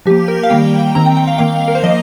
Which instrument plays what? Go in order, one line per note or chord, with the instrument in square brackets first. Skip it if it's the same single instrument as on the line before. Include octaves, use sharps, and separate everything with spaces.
[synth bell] F3 A#3 G4
A#4
F5
D#3 G3 A#3 G5
D#3 C4 A#5
G5
G5
F5
D#3 A#3 F5
A#4
C5
F3 A#3 D#5